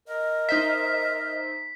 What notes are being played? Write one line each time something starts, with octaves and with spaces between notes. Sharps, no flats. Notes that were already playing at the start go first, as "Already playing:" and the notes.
A#4 D#5
D#4 C5 E5 B6